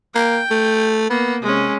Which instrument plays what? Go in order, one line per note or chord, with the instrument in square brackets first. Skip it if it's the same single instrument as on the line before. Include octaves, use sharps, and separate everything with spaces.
[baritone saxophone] A#3 [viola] G5
[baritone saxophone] A3
[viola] A#3 [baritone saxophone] B3
[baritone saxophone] C3 [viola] G#3 C#4